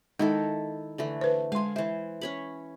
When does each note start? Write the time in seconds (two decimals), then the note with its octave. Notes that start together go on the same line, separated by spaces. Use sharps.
0.19 D#3 G#3 D#4 E4 A4
0.98 D3 E3 A3
1.21 B4 C5
1.52 G#3 F5 G#5 C6
1.76 E3 C5 E5
2.21 C#4 C#5 B5